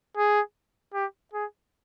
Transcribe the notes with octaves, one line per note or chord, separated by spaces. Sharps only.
G#4
G4
G#4